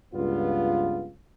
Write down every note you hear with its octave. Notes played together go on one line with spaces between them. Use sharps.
C#2 G2 B3 F4